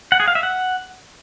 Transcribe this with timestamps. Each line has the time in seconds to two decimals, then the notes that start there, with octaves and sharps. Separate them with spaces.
0.12 F#5
0.20 G#4
0.28 F5
0.35 E5
0.43 F#5